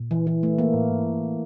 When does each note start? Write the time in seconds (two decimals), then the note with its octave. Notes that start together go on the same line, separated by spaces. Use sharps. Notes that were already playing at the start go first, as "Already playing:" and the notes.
Already playing: A#2
0.11 E3
0.27 E3
0.43 A3
0.59 A#3
0.74 A2
0.90 G#2
1.04 G2
1.20 A2